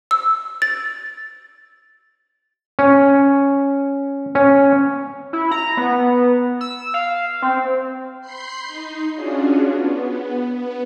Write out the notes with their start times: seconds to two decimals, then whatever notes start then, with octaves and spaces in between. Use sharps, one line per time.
0.11 E6
0.62 A6
2.79 C#4
4.35 C#4
5.33 E4
5.52 A#5
5.77 B3
6.61 E6
6.94 F5
7.42 C4
8.21 B5 C6 G6 C7
8.64 D#4
9.14 C#4 D4 F4 F#4 G#4
9.67 B3
10.54 B3